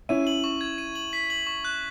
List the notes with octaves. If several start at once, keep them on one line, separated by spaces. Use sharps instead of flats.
C#4 E4 D#7
F#7
C#6
G#6
D#7
F#7
B6
F#7
C#6
F#6